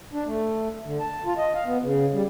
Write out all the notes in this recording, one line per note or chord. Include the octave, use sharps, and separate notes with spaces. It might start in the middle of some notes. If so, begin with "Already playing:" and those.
D4
A3
D3
A5
F4
D#5
F5
B3
C#3
G3